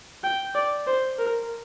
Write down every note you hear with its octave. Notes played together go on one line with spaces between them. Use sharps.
G5
D5
C5
A#4